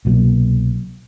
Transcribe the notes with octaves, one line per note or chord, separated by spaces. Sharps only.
C2 B2 F#3 A#3